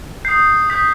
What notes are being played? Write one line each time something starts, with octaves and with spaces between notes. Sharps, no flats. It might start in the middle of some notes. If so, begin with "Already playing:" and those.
D#6 G6 C7
D#6 G6 B6